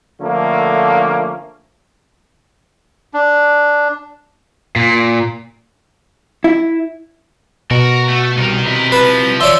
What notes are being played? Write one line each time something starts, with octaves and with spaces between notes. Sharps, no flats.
D3 F3 A3 A#3 C#4
D4
A#2
E4
B2 F#4 A#4
A3
C2 D#4 A#4
C3 E4
F3 B4
E3 C#5 D5 E5 C6